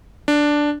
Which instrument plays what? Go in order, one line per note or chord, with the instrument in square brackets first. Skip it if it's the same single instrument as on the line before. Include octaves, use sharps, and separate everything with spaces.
[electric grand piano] D4